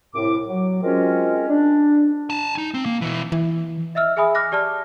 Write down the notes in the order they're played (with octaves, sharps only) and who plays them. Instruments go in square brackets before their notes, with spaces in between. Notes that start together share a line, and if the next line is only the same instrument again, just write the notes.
[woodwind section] C2 A2 D6
F#3
G#3 C4 C#4 F4 F#4 A#4
D4
[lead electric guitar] G#5 A5
D#4
C4
A#3
B2 E3
[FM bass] E3
[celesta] D#5 E5 E6 F6
G#4 E5 G#5 B5 D#6
D6 F6 F#6 A#6
G4 D5 A5 F6